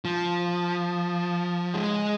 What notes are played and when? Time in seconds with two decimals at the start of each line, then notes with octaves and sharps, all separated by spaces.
0.05 F3
1.74 G#3